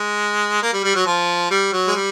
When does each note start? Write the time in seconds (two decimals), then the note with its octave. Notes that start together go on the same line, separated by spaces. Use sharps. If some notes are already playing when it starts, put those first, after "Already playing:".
Already playing: G#3
0.62 A#3
0.73 G3
0.84 G3
0.95 F#3
1.06 F3
1.50 G3
1.73 F#3
1.87 G#3
1.95 G3